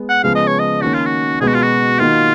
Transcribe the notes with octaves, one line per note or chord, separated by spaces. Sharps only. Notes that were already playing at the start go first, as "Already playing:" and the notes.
Already playing: G#3 B3
F#5
C#3 F3 G#3 B3 F5
D#5
C#5
D#5
D#3 A#3 C#4 F#4
F4
F#4
B2 G#3 B3 G#4
F#4
F4
F#4
D#3 A#3 D#4 F4 F#4